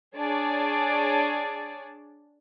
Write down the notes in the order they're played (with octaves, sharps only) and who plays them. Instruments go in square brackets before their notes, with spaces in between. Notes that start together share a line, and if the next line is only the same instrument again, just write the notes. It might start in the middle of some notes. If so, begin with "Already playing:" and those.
[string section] D4 G#4 C#5 D5 A5